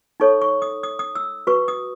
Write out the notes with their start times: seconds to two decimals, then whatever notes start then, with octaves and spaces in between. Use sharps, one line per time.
0.20 D#4 A4 C#5 C#6
0.42 C#6
0.62 D#6
0.83 D#6
0.99 D#6
1.15 E6
1.47 F#4 B4 C#6
1.68 D#6